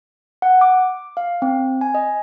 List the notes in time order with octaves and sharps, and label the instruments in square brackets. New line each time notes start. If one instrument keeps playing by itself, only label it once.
[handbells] F#5
D6
F5
C4
G#5
D#5